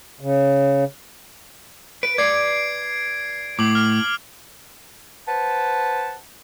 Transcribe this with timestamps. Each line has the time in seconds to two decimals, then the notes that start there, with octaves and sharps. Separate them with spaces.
0.21 C#3
2.03 B4 D7
2.18 B4 D5 G#6 C7
3.59 A2 D6 F#7
3.72 D6 F6
5.27 B4 C5 F#5 A5